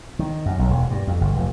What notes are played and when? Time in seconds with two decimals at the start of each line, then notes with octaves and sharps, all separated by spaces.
0.19 D#3
0.46 F#2
0.59 B1
0.70 E1
0.91 G2
1.07 F2
1.21 G1
1.36 F1